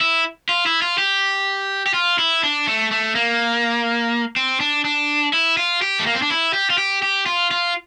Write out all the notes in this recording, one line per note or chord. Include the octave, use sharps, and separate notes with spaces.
E4
F4
E4
F4
G4
G4
F4
E4
D4
A3
A3
A#3
C4
D4
D4
E4
F4
G4
A3
A#3
C4
D4
E4
G4
F4
G4
G4
F4
F4